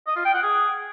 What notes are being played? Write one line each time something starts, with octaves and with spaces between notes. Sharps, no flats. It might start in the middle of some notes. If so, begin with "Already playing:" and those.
D#5
F4
G5
F#5
G#4